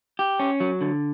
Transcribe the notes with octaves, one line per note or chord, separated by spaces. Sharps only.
G4
C#4
F#3
D3